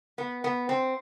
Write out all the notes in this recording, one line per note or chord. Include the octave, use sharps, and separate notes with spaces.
B3
B3
C4